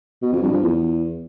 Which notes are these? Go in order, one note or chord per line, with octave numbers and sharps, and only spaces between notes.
B2
F2
G2
F3
E2